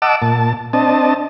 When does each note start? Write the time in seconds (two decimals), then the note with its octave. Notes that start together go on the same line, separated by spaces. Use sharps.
0.02 D#5 F#5 A5 D6 E6
0.22 A#2 A5
0.73 C4 D4 D#5 A5